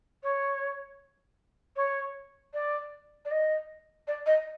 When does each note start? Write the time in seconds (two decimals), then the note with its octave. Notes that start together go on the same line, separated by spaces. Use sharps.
0.23 C#5
1.76 C#5
2.54 D5
3.25 D5
3.31 D#5
4.07 D5
4.26 D#5